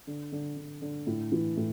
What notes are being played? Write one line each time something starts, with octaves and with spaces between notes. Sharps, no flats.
D3
D3
D3
D3
A2
E3
A2